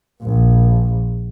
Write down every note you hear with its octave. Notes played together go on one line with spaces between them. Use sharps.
A#1